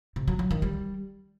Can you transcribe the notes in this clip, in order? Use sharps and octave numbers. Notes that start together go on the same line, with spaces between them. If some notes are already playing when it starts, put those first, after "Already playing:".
C3
F#3
F#3
D#3
G3